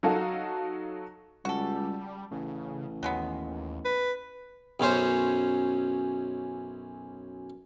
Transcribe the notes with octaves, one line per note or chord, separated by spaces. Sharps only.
F#3 D#4 F#4 A4 F5
C#2 G3 F#4 A4
A1 C#3
D#2 F#3 G#3 B3
B4
B1 F#2 C#4 C5